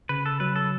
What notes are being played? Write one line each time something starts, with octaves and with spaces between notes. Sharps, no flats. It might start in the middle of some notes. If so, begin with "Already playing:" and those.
C#3 B4
A4
F#3 B4
A4